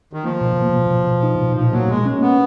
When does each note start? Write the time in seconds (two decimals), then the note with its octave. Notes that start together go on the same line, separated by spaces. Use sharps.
0.13 D#3
0.24 F3 A#3
0.41 B2
0.57 B2
0.73 B2
0.91 B2
1.07 B2
1.23 D#4
1.39 B2
1.57 A#2 F3
1.73 F#3 A#3
1.89 G#3 A#3
2.06 C#4
2.22 A#3 B3